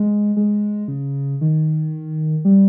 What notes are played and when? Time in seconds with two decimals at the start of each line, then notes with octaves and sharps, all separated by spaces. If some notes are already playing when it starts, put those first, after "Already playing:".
Already playing: G#3
0.37 G#3
0.88 C#3
1.41 D#3
2.45 G3